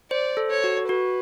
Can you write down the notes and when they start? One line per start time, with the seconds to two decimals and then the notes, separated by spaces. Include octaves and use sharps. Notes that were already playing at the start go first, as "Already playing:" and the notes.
0.11 C5 D5
0.37 A4
0.50 C#5
0.64 F#4
0.89 F#4 B4